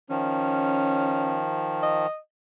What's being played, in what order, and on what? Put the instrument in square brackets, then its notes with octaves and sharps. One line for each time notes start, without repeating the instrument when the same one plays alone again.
[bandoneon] D#3 F3 [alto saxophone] C#4
[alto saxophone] D#5